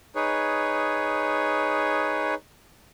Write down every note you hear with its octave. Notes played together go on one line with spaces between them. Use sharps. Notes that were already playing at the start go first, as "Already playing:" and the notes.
D#4 G#4 B4 C#5